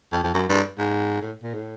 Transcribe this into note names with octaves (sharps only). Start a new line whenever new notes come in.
F2
F2
F#2
G2
G#2
A2
A#2
A2